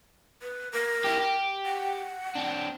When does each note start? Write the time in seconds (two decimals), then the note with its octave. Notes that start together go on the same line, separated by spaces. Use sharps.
0.42 B4
0.72 A#4
1.04 E4 G4
1.19 G4
1.66 F#5
2.35 C4 D4